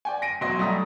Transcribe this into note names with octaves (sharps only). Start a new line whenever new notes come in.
D5 G5 G#5
A#6 D7 D#7
E1 F#3 F#4 D#5 C6 A#6
F#3 G3 A3 G4 A#5 D#6